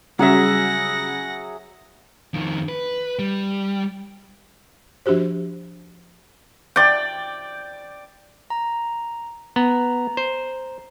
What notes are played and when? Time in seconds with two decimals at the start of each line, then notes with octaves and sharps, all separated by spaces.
0.19 C#3 F#3 G3 F#4 G#4 E5 F#5 A#6
2.34 F2 D#3
2.69 B4
3.19 G3
5.06 F3 D4 F#4 G4 C5
6.76 D5 G5
8.50 A#5
9.56 B3 A#5
10.17 C5